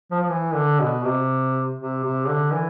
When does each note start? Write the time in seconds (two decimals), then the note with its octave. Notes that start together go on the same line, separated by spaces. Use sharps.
0.12 F3
0.23 F3
0.30 E3
0.55 D3
0.80 B2
1.04 C3
1.79 C3
2.04 C3
2.29 D3
2.53 E3